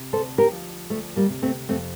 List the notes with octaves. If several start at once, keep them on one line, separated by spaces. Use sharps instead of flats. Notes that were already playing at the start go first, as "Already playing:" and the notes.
Already playing: C3
D2 A4 C5
G4 A#4
F3
D2 A3
G3 A#3
C3
A3 C4
F2 A3 C4